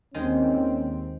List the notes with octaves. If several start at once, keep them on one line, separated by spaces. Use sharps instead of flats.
D#2 D#3 G#3 C4 C#4